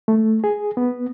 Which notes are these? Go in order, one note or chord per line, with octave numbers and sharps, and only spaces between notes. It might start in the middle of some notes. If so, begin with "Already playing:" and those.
A3
G#4
B3